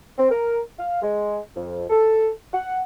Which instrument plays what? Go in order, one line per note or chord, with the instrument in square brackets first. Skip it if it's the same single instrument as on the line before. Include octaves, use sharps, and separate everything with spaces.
[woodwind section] C4
A#4
F5
G#3
F2
A4
F#5